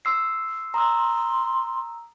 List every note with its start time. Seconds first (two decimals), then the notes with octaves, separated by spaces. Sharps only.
0.05 C6 E6 C7
0.74 A#5 C6 D#6 E6